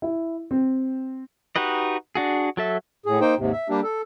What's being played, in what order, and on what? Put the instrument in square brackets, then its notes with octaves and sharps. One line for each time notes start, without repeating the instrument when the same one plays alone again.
[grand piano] E4
C4
[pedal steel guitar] D#4 F#4 G4 B4 D#5
D4 F#4 G#4
F#3 A4 E5
[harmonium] A2 G#4
A#3 D#4 C5 G5
D#2 G#2 C3
E5
G3 A#3 D4 G4
A4